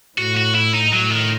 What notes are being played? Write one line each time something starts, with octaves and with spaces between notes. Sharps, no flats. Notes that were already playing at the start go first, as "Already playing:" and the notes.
A2 F#4
F#4
E4
D#4
A2 F#3
D#3